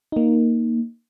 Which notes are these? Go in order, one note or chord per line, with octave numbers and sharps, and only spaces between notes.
A#3 D#4